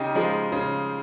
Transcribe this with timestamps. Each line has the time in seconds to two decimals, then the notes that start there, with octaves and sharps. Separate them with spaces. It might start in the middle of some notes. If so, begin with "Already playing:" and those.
Already playing: C#3 D#4 G4
0.15 F3 G#3
0.52 C#3